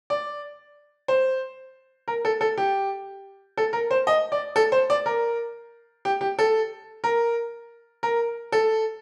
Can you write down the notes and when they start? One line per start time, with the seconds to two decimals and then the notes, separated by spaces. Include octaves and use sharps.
0.10 D5
1.08 C5
2.08 A#4
2.25 A4
2.41 A4
2.58 G4
3.57 A4
3.73 A#4
3.91 C5
4.07 D#5
4.32 D5
4.56 A4
4.72 C5
4.90 D5
5.06 A#4
6.05 G4
6.21 G4
6.39 A4
7.04 A#4
8.03 A#4
8.52 A4